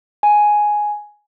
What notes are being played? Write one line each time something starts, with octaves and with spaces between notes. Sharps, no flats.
G#5